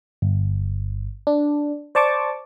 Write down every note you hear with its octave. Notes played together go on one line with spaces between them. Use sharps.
G1
D4
C5 D5 A5 C#6 D6